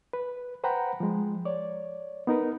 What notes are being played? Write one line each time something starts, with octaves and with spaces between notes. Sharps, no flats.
B4
B4 C5 F#5 G5 A#5 B5
F3 G#3
C#5 D5
B3 D#4 A#4 B4